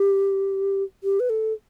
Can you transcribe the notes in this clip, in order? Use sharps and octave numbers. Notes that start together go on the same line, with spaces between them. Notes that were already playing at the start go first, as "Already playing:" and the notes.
Already playing: G4
G4
B4
A4